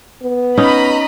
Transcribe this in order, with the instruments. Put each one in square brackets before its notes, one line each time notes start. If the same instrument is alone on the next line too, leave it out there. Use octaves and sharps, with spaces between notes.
[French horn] B3
[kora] C#4 D#4 [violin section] D#5 A#5 B5